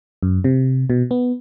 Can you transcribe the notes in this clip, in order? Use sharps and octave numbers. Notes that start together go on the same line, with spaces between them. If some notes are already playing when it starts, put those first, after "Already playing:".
F#2
C3
B2
B3